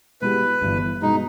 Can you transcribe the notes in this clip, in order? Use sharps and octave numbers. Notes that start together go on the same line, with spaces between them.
B2 G#3 B3 E4 G4 B4
G1 G2 E3
B2 G#3 D#4